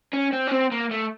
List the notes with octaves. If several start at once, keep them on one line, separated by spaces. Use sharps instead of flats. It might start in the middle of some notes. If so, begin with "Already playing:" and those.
C#4
C4
C#4
C4
A#3
A3